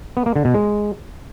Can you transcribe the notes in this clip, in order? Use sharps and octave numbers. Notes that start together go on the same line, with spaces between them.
B3
A#3
D3
B2
G#3